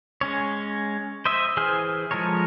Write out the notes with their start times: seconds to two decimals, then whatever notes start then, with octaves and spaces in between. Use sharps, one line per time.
0.21 G#3 C#4 C#5
1.25 C5 D#5 E5
1.57 E3 G#4 C5 G#5 F6
2.11 F3 G#3 A4 A#4 C#5